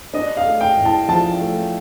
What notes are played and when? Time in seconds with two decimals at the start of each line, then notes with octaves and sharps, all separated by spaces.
0.14 D4 D#5
0.37 F5
0.45 A3
0.61 G5
0.77 A2
0.85 A5
1.08 F3 A5
1.40 A3